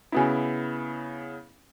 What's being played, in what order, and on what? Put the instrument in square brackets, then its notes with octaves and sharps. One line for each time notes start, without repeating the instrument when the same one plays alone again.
[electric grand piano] C#3 B3 E4 [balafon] C#4 F#4 G#5